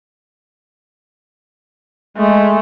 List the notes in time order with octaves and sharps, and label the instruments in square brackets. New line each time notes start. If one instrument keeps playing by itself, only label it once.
[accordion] G#3 [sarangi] A3